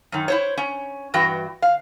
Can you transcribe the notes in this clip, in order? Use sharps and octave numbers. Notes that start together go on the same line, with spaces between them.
F#2 D#3
E4 C5 C#5
C#4
G2 E3 F#4 G5
F5